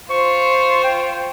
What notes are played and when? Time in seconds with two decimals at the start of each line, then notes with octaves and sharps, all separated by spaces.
0.10 F4 C5 C#6
0.84 G5